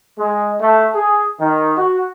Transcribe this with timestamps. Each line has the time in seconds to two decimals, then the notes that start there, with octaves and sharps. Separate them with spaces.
0.18 G#3
0.61 A3
0.95 G#4
1.40 D#3
1.77 F#4